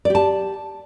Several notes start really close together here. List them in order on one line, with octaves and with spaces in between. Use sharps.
D5 G4 A5